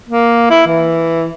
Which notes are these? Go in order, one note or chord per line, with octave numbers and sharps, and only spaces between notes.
A#3
E4
E3